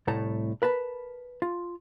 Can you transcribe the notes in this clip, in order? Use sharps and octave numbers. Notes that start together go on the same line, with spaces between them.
C2 A2 A3 A5 A#5
A#4 B4 A5 B5
F4